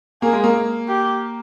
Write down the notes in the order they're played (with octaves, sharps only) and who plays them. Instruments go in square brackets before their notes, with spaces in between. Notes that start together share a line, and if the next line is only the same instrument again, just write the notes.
[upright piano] A#3 [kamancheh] G#4
[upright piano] G#3
A#3
[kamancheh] G4